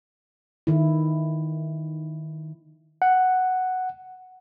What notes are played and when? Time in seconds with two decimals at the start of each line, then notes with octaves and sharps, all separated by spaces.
0.67 D#3 E4
3.02 F#5